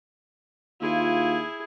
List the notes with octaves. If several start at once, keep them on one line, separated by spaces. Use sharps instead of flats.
D#2 E4 F4 G#4